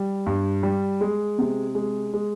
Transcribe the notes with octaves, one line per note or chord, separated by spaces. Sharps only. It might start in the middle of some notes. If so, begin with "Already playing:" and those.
Already playing: G3
G2
G3
G#3
C3
G#3
G#3